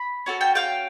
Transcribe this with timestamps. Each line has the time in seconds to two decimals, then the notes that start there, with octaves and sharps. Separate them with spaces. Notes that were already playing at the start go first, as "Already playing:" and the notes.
Already playing: B5
0.26 C#4 F#4 A4
0.41 G5 A5
0.55 F5 G5